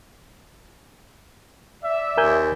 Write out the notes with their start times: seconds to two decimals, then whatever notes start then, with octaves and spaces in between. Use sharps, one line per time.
1.83 D5 E5
2.18 D#2 A#4 G#5 G6